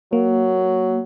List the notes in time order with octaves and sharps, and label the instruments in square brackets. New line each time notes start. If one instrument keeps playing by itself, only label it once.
[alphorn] F#3 [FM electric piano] A#3